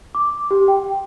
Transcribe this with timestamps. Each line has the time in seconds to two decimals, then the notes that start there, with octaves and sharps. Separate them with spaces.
0.15 D6
0.51 G4
0.68 G5